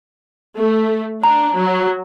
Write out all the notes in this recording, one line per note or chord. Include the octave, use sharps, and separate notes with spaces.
A3
D4 A#5
F#3